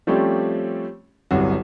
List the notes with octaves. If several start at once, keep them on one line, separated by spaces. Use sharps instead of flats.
F3 G3 A3 C4 C#4 G4
G1 C2 F#3 F#4